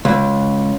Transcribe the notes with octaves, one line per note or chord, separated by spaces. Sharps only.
C#2